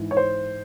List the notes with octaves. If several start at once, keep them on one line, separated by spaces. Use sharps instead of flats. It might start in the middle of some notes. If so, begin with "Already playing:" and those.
Already playing: G#2 E3
C#5
C5